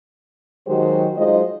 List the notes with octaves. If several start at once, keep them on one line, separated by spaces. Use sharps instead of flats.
D#3 F#3 G#3 F#4 G4 C5
F#3 G#3 D#4 F4 C5 D#5